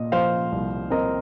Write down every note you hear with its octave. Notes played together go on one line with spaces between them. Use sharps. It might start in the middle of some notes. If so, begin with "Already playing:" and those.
Already playing: A#2 D#5
F3 C5 F5
C2
C4 A#4 D#5